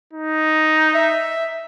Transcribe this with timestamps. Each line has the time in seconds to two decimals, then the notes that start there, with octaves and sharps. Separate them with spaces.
0.13 D#4
0.94 E5